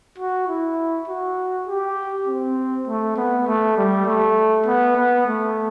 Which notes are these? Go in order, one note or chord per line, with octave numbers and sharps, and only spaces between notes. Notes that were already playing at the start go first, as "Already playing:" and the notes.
F#4
E4
F#4
G4
C4
A3
B3
A3
G3
A3
B3
B3
A3